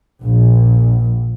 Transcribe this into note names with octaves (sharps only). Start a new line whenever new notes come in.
A#1